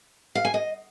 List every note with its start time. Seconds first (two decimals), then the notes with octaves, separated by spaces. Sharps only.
0.35 F5
0.45 G#5
0.54 D#5